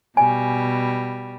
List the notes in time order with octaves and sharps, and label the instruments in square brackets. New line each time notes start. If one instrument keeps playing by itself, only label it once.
[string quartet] B2 G3 [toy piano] G#5